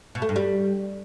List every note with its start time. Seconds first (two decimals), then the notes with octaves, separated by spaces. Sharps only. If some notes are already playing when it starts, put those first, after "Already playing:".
0.15 B2
0.22 A3
0.29 G2
0.36 G3